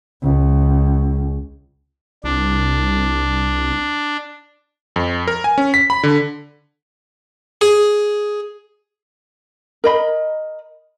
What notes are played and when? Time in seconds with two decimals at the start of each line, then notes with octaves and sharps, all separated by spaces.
0.23 C#2
2.24 C2 D4
4.96 F2
5.28 A#4
5.44 G#5
5.58 C#4
5.74 B6
5.90 B5
6.03 D3
7.61 G#4
9.84 A#4 D#5 B5